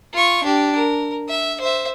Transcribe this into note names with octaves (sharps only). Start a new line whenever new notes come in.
F4 C#6
D4 G4
A#4
E5
C5 E5